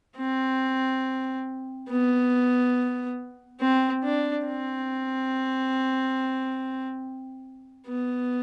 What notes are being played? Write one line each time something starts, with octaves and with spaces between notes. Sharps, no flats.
C4
B3
C4
D4
C4
B3